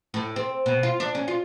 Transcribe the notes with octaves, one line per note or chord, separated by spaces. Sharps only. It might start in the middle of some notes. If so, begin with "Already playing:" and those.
A2
C4
B2
F4
D4
C#4
F4